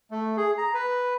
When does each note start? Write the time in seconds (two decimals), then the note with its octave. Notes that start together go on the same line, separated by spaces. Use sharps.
0.11 A3
0.37 G#4
0.58 A#5
0.74 B4